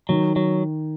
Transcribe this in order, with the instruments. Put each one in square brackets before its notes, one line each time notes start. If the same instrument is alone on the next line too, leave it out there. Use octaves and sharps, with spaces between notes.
[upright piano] D#3 [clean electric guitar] F#3
[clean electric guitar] F#3